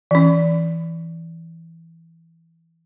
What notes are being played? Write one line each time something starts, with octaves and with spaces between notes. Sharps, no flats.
E3 C#4